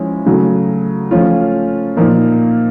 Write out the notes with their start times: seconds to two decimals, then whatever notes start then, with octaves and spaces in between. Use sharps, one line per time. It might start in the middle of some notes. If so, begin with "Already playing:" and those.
Already playing: F3 G#3 C#4 E4
0.26 C#3 F#3 A3
1.11 F3 A3 C#4 F4
1.97 A#2 F3 A#3 D#4